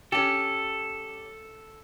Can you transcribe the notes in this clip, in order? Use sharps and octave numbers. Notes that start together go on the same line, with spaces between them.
C#4 G4 A4